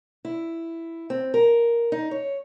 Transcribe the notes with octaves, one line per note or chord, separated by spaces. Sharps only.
E4
C4
A#4
D#4
C#5